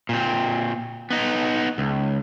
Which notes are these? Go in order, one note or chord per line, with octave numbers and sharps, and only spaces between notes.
A#2 C4
B3 D#4
C#2